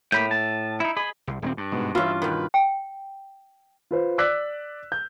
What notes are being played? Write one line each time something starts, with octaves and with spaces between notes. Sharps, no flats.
A2 A#3 B5 G6
A5
D#4 E4
G#4 D#5 B5
C2
D#1 A#3 C4
G2
G#2 B2
E3 C#4 F4 B4 E5
B2 D#3 B4
G5
F4 B4 C5
D5 D6 E6 F#6 B6
G6